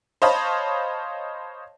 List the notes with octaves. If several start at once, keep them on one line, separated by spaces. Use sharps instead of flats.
C5 C#5 D#5 F5 A5 B5